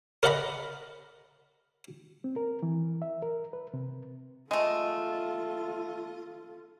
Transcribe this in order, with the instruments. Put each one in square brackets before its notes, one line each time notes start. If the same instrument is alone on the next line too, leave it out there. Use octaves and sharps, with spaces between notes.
[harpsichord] A#4 D5 D#5 F#5 A#5 B5
[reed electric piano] C4
A#4
E3
E5
A#4
B4
C3
[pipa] G#3 A3 [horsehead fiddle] F4 A4 [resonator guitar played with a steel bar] D#5